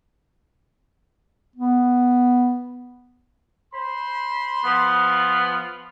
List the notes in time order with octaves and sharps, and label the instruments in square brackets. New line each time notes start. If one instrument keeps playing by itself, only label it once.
[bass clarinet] B3
[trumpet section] C5 B5 C6
[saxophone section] F3 B3